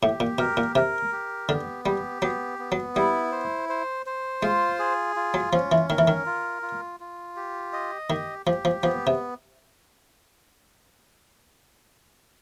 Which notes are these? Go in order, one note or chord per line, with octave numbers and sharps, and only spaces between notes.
A2 G4
A#2
B2 A#4
A#2
C3 A#4
G4
D3 B3
G3 G4
F#3 B3
B3
F#3
G3 E4
C5
C5
C5
G#3 F4
G#4
F4
F#3
F3 C#4
E3
D#3 A#4
E3
D#3
F4
F4
F4
G4
D#5
D#3 G4
F3 G4
F3
F3 B3
C3